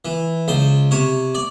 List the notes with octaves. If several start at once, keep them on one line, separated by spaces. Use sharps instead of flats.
E3
C#2 C5
C3 C#5
D5